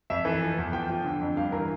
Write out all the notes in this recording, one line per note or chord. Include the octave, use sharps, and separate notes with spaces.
F2 E5
E3 A4
F3
E2
F3 G5
F3
D3
F2
G2 F5
E3 A#4